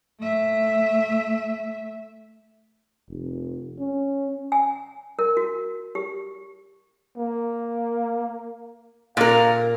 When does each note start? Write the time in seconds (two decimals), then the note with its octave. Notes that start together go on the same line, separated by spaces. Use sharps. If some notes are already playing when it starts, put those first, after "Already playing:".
0.19 A3 E5
3.08 F1
3.79 C#4
4.52 G#5
5.19 A#4
5.37 F#4
5.95 G4
7.18 A#3
9.17 A#2 A#4 F5